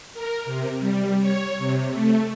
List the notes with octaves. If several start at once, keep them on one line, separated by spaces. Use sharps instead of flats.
A#4
C3
G3
C#5
C3
A3